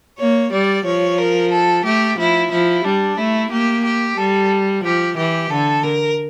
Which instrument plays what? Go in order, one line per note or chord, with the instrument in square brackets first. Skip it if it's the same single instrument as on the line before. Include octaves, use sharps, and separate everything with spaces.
[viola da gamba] A#3 [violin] C#5
[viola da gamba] G3 [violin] D5
[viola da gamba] F3 [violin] C#5
[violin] A#4
A4
[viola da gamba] A3 [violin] G4
[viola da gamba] F3 [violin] E4
[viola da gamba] F3 [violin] E4
[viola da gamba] G3 [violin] D4
[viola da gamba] A3 [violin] E4
[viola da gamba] A#3 [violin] G4
[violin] G4
[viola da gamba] G3 [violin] A4
[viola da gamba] F3 [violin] G4
[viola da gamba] E3 [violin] G4
[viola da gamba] D3 [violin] A4
[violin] A#4